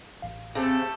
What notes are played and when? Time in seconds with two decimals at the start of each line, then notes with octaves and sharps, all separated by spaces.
0.22 A1 F5
0.55 C#3 A3 C4 G4 A4